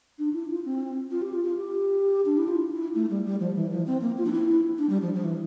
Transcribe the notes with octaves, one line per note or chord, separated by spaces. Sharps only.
D4
E4
F4
C4
F4
G4
F4
F4
G4
D4
E4
F4
E4
A3
G3
G3
F3
E3
F3
C4
A#3
F4
D4
E4
D4
G3
F3
F3
E3